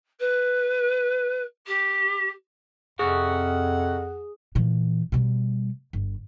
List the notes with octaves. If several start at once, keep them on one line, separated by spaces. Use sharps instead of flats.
B4
G4
F2 C3 C#4 F#4 G#4 F#5
A#2 E3
B2 G3
G1